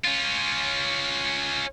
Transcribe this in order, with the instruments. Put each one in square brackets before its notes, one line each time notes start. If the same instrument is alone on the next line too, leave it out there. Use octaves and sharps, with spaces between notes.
[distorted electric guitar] C#4 F4